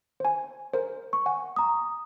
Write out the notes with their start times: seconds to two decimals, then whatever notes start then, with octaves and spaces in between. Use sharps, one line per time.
0.20 C5 G#5
0.73 A#4 C5
1.13 C#6
1.26 F#5 G#5
1.56 A#5 D#6